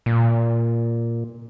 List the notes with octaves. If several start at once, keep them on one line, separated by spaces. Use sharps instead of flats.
A#2